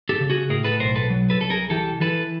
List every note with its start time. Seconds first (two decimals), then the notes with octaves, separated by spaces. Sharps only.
0.09 G4 A4
0.20 C#3
0.30 F#4 G#4
0.49 A2 G#4 A#4
0.64 A4 B4
0.80 B1 A#4 C5
0.95 A4 B4
1.10 F#3
1.30 A4 B4
1.41 C2 A4
1.50 G#4 A#4
1.70 E3 G4 A4
2.01 E3 A4 B4